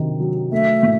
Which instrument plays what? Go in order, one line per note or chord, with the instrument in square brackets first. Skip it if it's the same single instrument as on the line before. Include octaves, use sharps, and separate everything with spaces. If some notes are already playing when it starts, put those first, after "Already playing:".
Already playing: [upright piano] C3 D#3 F#3
F#3
[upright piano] A3 [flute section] E5
[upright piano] A2